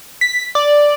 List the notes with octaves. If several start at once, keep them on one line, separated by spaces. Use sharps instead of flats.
B6
D5